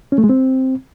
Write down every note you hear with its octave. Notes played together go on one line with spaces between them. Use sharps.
C#4
A3
G#3
C4